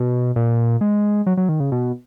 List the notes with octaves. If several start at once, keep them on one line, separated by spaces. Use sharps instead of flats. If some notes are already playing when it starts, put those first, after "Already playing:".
Already playing: B2
A#2
G#3
F#3
F#3
D#3
C#3
B2